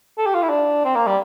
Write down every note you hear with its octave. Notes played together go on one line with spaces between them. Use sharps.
A4
G4
F4
E4
D4
C4
A#3
G3